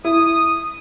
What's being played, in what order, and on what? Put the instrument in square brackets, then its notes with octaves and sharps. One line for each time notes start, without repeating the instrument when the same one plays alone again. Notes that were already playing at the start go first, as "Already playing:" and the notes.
[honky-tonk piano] E4 [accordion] D#6